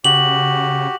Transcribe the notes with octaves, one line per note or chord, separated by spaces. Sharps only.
C#3 F#4 G4 F#7